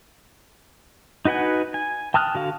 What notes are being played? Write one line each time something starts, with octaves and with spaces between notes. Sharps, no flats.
D#4 F#4 B4 F#5 G#5
G#5
G5 A5 D#6 F6 F#6
D3 F#4 F5